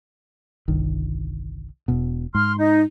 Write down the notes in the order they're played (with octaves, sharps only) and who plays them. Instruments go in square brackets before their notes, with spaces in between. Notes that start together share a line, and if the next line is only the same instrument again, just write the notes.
[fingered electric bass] G1 C2 D#3
E1 B2
[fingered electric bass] G#2 [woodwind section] C6 F6
[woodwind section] D#4